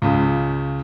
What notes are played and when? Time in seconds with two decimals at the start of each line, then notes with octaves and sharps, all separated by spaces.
0.02 C#2 C#3